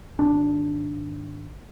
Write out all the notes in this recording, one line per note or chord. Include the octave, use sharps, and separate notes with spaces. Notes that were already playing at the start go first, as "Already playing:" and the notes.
G#1 D4